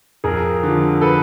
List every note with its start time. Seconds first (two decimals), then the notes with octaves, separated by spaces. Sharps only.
0.24 F2 G#4 A#4
0.63 D3 F3
1.01 A4 B4